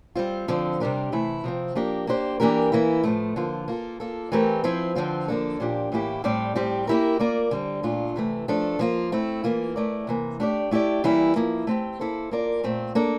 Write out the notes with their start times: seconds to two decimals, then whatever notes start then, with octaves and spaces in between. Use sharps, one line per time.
0.15 G3 C4 F4
0.48 D3 F3 C4
0.80 C3 G3 D4 G4 A#4
1.12 C3 E3 A3 E4
1.44 C3 F3 C4
1.75 F3 A#3 D4 G4 A#4
2.07 A#3 D4 G4 C5
2.40 E3 A#3 D4 G4 A#4
2.72 E3 A#3 E4
3.04 A2 F3 A3
3.36 D3 F3 A#3 F4
3.68 A#3 F4 A4
4.00 A#3 F4 A4
4.32 E3 A3 C4 G4 A#4
4.64 F3 C4 E4
4.95 D3 F3 C4 F4
5.28 D3 F3 A#3 D4 A4
5.60 A#2 F3 A#3 D4 G4
5.92 A2 E3 A#3 E4 G4
6.24 A2 G3 C4 G4 D5
6.55 A2 G3 C4 G4
6.87 A#3 E4 G4 A#4
7.19 A#3 F4 A#4 D5
7.51 D3 G3 C4
7.83 A#2 A3 D4 F4
8.16 C3 E3 A3
8.48 F3 A3 D4 A4
8.79 F3 A#3 F4
9.12 A3 C4 E4
9.44 E3 A#3 F4
9.76 A3 E4 A#4 D5
10.07 C3 E3 A#3
10.40 A3 D4 G4 D5
10.71 A3 E4 G4 D5
11.04 E3 G3 A#3 E4
11.36 F3 A#3 E4
11.67 A3 C4 G4
12.00 A#3 E4 A4 C5
12.31 A#3 F4 A#4 D5
12.63 A#2 A3 C4
12.95 A#3 D4 A4